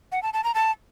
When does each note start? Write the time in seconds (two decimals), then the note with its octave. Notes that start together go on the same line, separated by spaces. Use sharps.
0.12 F#5
0.23 A5
0.33 A5
0.44 A#5
0.55 A5